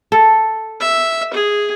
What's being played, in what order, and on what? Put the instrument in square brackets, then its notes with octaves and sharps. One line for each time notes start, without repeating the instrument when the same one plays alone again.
[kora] A4
[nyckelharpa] E5
G#4